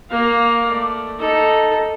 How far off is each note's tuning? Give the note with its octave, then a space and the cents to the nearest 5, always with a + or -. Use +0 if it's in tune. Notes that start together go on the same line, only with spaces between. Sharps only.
A#3 +0 F5 +15
A3 +0 D5 +5
D#4 +0 A4 +0